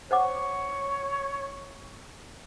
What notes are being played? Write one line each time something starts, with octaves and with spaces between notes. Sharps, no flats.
C5 C#5 F#5 D6